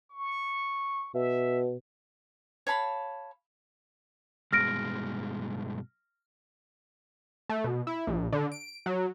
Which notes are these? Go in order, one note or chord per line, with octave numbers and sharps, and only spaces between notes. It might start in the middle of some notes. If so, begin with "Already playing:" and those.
C#6
B2 E5
C#5 F5 A5 B5
G2 B2 G#3 F6 A#6 D7
A3
B2
E4
A#1
D3
D7
F#3